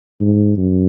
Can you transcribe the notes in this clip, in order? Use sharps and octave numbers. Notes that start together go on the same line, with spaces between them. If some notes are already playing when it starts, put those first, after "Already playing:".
G#2
F#2